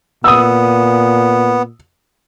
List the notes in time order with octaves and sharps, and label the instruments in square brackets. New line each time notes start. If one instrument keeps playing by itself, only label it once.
[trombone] A#2 [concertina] B3 [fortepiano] D#6 E6